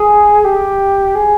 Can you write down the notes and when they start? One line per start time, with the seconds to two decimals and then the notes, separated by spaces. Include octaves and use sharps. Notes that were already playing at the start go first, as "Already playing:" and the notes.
Already playing: G#4
0.45 G4
1.15 G#4